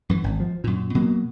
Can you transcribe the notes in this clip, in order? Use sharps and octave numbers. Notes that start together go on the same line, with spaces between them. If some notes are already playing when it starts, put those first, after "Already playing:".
F#2 E3
G#1
F3
F#2 A#2
B2 F#3 A#3